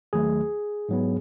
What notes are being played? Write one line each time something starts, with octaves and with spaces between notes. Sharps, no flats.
D#2 D#3 F#3 A3 G#4
G#2 F#3 B3